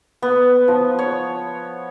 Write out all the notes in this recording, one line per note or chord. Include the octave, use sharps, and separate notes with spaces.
B3
F3
C#5